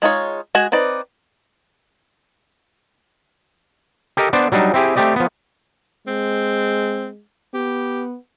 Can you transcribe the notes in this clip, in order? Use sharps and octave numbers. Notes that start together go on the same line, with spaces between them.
G#3 D#4 F4 C#5
G#3 F#4 G#5
C4 D#4 B4 D5
G4 A4 A#4 D#5 G5
B3 D4 C5 D5
F#3 G3 D4 D#4
C4 E4 G4 G#4
A3 C4 G4 D5 D#5
F3 B3
G#3 C4
B3 G4